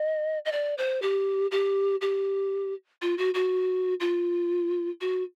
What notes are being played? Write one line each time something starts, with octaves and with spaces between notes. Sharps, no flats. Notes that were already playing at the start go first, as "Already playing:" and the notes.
Already playing: D#5
D#5
D5
C5
G4
G4
G4
F4
F#4
F#4
F4
F#4